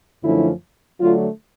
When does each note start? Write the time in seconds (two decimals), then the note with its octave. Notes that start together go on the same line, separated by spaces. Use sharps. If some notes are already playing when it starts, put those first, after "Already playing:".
0.23 F#2 D3 F3 A3 C#4 E4
1.00 D3 F#3 A3 D4 F4